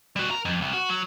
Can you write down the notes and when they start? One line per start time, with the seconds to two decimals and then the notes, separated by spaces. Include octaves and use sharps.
0.16 G3 F#4
0.31 A#4 A#5
0.45 F2
0.61 C2
0.74 F#4
0.90 F#3